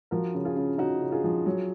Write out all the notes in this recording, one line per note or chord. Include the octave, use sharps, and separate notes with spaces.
F3 F#4 A#4
C#3
F4 G#4
C#3
C#3 D#4 F#4
C#3
F4 G#4
F3
F#3